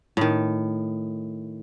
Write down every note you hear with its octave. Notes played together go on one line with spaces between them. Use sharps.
A2 D#3